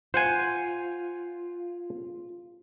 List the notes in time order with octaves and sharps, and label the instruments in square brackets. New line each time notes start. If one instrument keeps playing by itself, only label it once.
[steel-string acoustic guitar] F4 [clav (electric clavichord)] C5 F#5 G#5